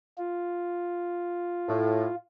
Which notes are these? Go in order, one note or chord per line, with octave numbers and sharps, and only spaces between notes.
F4
A2